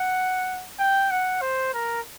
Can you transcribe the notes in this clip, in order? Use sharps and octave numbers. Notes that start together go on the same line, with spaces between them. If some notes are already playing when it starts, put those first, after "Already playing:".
Already playing: F#5
G5
F#5
C5
A#4